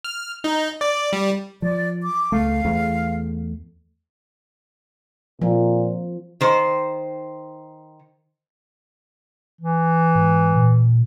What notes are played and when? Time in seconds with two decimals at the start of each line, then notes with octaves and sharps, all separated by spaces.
0.05 F6
0.44 D#4
0.81 D5
1.13 G3
1.62 F3 D5
2.03 D6
2.32 C#2 A3 F5
2.64 E2 A3
5.42 A#2 F3
6.41 D#3 C5
9.61 E3
10.15 G#2
10.56 A#2